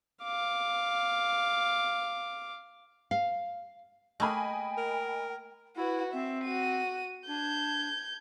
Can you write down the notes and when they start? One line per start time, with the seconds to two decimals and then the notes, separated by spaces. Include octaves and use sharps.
0.23 F5 D6
3.11 F5
4.20 A3 A#3 G#4 D#5 G5 G#5 B5
4.77 A#4
5.76 E4 F#4 B4
6.13 C4 E5
6.44 F#4 D#7
7.27 D4 G6 G#6